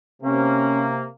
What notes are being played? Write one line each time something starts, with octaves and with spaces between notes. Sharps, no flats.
C3 A#3 C#4